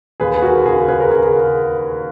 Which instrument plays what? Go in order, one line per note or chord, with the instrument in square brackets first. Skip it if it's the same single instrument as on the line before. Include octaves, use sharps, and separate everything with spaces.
[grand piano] D#2 G#4 B4
G#4
F#4 A#4
C#3 G#4
G#4 B4
A#4
C#3 G#4
G#4